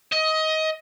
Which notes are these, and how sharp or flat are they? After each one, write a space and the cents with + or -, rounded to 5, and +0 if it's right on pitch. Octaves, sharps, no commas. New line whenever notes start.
D#5 +20